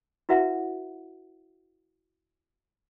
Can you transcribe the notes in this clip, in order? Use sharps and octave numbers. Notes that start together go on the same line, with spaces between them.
E4 F#4 B4 E5 F#5 A#5